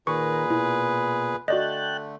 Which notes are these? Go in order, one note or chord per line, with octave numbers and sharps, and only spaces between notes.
A#2 D#3 G#4 A#4 B4 C#6
B2 E4
D3 A3 F#4 D5 D#5 G5 A5 F#6